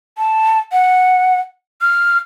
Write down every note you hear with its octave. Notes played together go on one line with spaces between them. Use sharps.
A5
F#5
F6